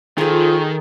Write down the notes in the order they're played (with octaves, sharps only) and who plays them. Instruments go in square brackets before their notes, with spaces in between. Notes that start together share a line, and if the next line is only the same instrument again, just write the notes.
[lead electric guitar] D#3 [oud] F3 F4 [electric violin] G#4 A4